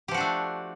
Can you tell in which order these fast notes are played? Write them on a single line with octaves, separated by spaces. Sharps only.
G4 F3 F#4 D4 A3